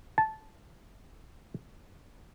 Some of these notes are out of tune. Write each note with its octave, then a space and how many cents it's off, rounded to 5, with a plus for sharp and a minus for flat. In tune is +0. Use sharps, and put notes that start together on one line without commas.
A5 -10